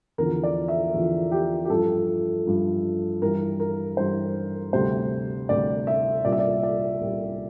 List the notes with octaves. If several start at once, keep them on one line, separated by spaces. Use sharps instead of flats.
E2 D3 F3 A#4
D5
E5
E2 D3 F3
G4
G4
G2 F3 A4
G2 F3
G2 E3 G3 A#4
A#4
G2 E3 G3 C5
D2 C3 G3 C5
D2 C3 G3 D5
E5
C2 A#2 G3 D5
E5
D5
D5
C2 A#2 G3